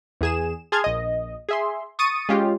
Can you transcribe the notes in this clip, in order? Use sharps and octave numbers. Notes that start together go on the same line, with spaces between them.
E2 G#4 E7
G#4 A5 C6 F6 G#6
A#1 D#5
G#4 E5 C6
C#6 D#6 A6 C#7 D#7
G#3 C#4 F4 G4